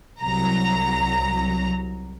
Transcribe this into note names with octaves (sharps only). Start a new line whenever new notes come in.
C2 F#3 A#5